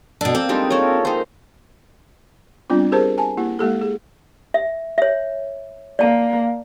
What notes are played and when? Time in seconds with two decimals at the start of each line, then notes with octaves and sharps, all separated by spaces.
0.21 B2 D4 A4
0.35 A#3 C4 A4
0.49 F3 G3 G#3 D4 D#4 G#4
0.70 A4 A#4 C#5
1.05 D#3 C4 D#4 G#4 C5
2.70 G3 B3 C4 D4 F4
2.92 G4 G#4 A#4 C5 A5
3.18 G#5 A5
3.37 A#3 E4 G4
3.59 G#3 A#3 G4 A4
3.81 G#4
4.54 E5
4.98 C#5 E5
5.99 A#3 D5 A5